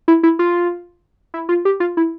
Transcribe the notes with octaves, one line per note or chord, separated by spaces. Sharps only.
E4
E4
F4
E4
F4
G4
F4
E4